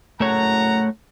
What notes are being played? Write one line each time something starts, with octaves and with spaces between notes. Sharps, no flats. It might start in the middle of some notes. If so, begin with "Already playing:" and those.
F#1 A3 C#5 F#5 A#5